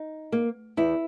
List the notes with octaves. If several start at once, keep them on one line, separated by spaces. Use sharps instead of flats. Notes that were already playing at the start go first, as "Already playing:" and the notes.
Already playing: D#4
A#3
E2 E4